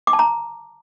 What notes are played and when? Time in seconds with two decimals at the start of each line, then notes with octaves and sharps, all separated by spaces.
0.07 D6
0.13 A5
0.19 A#5